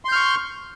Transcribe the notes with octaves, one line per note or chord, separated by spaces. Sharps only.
C6 C#6 F6 G6